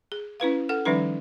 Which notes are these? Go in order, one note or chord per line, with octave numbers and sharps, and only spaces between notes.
G#4
C#4 E4 B4 F5
A4 F#5
D#3 F3 G3 C#4 D#4 B4